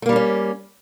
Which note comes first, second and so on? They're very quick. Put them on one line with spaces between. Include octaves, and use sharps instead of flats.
A3 A#3 G3 D#4 C#4